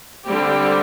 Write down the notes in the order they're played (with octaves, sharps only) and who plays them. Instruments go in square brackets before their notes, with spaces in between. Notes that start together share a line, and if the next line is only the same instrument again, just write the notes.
[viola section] D3 G3 C4 G4